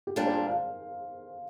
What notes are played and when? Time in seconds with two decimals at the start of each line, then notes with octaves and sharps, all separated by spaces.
0.07 G4
0.16 A#2 G3 D4 F4 A#4
0.26 C5
0.37 C5
0.47 F5